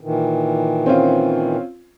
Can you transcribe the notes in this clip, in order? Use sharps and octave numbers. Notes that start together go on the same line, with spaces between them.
A#2 D#3 E3
C4 C#4 F4